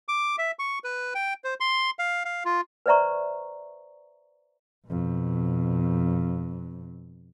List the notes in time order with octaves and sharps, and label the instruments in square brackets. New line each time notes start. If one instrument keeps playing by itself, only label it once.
[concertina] D6
E5
C#6
B4
G5
C5
C6
F5
F5
F4
[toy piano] B4 C5 D5 E5 A#5 C#6
[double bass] F2 B2